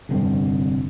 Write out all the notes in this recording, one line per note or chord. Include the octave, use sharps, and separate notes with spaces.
F1 G2 D3 C4